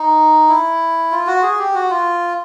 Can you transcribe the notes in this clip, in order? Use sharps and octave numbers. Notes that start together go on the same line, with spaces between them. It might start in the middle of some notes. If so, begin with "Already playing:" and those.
Already playing: D#4
E4
F4
F#4
G#4
G4
F#4
F4